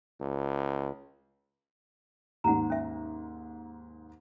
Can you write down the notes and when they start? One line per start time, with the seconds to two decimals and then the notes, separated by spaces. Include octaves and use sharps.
0.21 C#2
2.44 D#2 G#2 F#5 A#5
2.70 C#4 E5